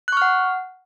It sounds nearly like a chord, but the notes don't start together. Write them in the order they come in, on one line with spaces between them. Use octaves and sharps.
F#6 C#6 F6 F#5